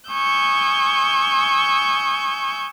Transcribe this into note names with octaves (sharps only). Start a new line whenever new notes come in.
G#5 C#6 D#6 E6 G6